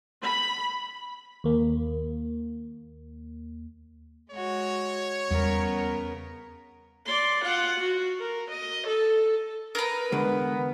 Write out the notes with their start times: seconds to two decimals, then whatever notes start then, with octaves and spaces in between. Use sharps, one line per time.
0.24 B5
1.44 D#2 A#3
4.31 G#3 F#4 C#5
5.31 E2 C#3 G3 B3 A#4
7.06 D5 C6
7.44 F4 F#5
7.80 F#4
8.20 A#4
8.51 D#5
8.87 A4
9.75 A#4 B4
10.12 E2 D3 G#3 B3